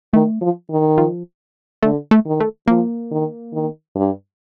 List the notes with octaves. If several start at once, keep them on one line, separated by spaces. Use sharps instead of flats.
D#3 A3
F3
D#3
F3
D3 A3
A3
D#3
A3
F3 A#3
D#3
D#3
G2